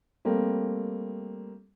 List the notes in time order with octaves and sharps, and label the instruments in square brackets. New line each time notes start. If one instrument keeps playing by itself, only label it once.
[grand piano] G3 A3 A#3 C4